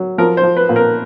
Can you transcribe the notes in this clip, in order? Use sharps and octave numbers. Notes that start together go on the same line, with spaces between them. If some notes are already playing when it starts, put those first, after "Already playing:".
Already playing: F#3
F3 A#4
C5
F3
B4
A#2
A#4